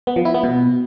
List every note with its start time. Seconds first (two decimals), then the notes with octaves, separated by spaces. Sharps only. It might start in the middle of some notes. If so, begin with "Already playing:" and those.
0.07 B3
0.16 F3
0.25 E4
0.34 B3
0.43 B2